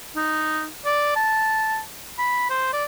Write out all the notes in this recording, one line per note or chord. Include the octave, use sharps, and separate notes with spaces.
D#4
D5
A5
B5
C5
D5